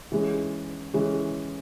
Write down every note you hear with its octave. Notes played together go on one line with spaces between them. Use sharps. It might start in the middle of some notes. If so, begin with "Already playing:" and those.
E3 G#3 C#4
E3 G#3 C#4